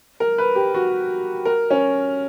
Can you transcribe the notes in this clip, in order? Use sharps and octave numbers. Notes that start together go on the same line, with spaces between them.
A#4
B4
G4
F#4
A#4
C#4